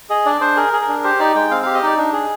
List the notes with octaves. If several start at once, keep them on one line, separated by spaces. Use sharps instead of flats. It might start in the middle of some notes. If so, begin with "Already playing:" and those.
G#4 D#5
D4 D5
D4 C5
G#4 A#4
G#4
A#4
D4
G4 C5
D#4 D5
G#3 G5
C4 F5
G4 F5
D#5
D#4 D5
D4
G#4